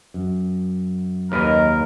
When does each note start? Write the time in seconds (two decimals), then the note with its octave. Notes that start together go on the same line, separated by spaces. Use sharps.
0.14 F#2
1.32 D#2 A#4 B4 D#5